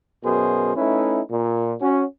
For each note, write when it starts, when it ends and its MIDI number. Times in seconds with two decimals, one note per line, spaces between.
0.24 0.72 42
0.24 0.72 47
0.24 0.72 68
0.24 0.72 70
0.24 0.72 72
0.77 1.21 57
0.77 1.21 61
0.77 1.21 63
0.77 1.21 64
0.77 1.21 71
1.30 1.74 46
1.81 2.04 61
1.81 2.04 66